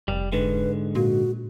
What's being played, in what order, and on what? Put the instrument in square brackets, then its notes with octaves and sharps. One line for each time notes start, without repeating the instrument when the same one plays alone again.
[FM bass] F1 [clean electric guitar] G3
[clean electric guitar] G#2 D3 G#3 [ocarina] B4
[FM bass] A#2 [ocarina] F#4